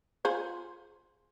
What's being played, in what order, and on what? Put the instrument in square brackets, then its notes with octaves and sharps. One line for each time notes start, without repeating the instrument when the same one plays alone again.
[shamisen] F4 G#4 C5